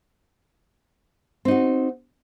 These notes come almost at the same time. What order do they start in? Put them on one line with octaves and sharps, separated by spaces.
C4 D#4 F#4